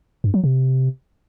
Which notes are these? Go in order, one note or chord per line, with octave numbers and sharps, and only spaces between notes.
G2
F#3
C3